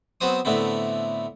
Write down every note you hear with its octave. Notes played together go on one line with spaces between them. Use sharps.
F#3 B3 C4 C5 D#6
A2 D3 A3 B3 C4